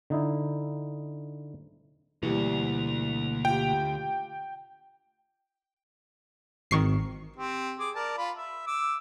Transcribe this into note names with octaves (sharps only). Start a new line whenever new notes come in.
D3 D#4 E4
D2 B2 E3 G3 A#3
F4 G4 G5
G#1 D#3 C#6 C7
C4 G4
G#4 D6
A#4 D5 A5
F4 B5
E5
D6 E6